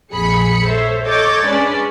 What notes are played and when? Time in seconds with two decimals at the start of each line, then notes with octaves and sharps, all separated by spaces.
0.13 A#1 F2 G#4 B5 C#7
0.66 A4 C5 C#5 E5
1.03 A4 C#5 D#5 D6 G6 A6
1.46 G#3 C#4 D4 B4 D5